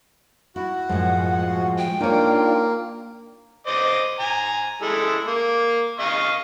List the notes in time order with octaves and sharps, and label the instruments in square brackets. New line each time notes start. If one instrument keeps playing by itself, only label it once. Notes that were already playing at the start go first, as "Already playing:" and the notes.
[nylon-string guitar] E4 [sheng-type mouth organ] F#4
[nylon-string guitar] F#2 A2 [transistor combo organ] F3 G#3 [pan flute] F#5
[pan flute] G5
[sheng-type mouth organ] A#3 [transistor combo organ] D4 F4 [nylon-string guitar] D#4 C#5
[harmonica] C5 D#5 D6
G#5 A#5
G#3 E4 A4
A#3
D#5 F5 C#6